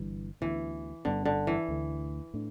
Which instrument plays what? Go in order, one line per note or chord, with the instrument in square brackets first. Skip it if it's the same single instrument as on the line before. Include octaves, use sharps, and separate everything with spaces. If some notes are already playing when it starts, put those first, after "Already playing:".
Already playing: [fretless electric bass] G1 G2 E3 G3
[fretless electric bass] D2 D3 B3 [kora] E3
[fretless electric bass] G1 G2 G3 B3 [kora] D3
[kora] D3
E3
[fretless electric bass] D2 D3 A3
A2 A3 D4